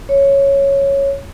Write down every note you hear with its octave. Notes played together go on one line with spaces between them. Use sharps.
C#5